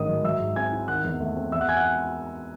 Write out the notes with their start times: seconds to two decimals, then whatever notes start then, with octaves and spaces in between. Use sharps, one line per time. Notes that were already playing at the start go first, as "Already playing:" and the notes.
Already playing: A1 G#2 D#3 D#5 D#6
0.08 F#3
0.24 F#3 E5 E6
0.40 G#2
0.56 C4 G#5 G#6
0.72 E4
0.88 D#3 F#5 F#6
1.04 E2
1.21 A3
1.36 C4
1.52 E2 E5 E6
1.60 F#5 F#6
1.69 G#5 G#6
1.77 F#5 F#6